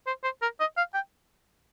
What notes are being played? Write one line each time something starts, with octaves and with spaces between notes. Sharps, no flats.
C5
C5
A#4
D#5
F5
G5